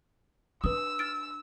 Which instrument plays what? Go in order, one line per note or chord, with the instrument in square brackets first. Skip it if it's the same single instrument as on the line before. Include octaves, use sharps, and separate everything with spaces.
[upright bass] D4 [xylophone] B4 D#6 [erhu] E6
[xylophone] F6 A6 D7